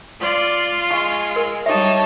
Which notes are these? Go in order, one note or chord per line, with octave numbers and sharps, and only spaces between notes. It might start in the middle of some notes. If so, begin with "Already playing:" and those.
F4 D5
G#3 F5 C#6
A#4
G3 D#4 G#4 C#5 E5 A5